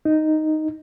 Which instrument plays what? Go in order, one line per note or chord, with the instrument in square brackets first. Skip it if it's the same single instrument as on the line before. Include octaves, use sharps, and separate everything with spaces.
[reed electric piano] D#4